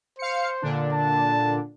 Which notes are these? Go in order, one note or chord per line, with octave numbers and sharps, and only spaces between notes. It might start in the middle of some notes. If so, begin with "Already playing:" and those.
C5 F5 C#7
A#2 D3 D4
A5